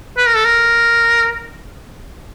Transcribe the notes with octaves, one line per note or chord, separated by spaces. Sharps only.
B4
A#4
A4
A#4